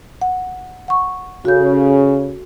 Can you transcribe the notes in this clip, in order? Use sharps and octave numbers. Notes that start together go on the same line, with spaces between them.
F#5
F#5 C#6
C#3 F#4 A4 G6